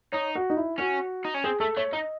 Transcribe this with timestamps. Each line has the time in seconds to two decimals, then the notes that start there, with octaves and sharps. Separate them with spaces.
0.12 D#4 C#5
0.35 F#4
0.50 D#4
0.57 E4
0.78 C#4 F#4
1.25 D#4
1.34 C#4
1.44 C4 G#4
1.60 A3 A4
1.77 A3 C#5
1.92 D#4 D#5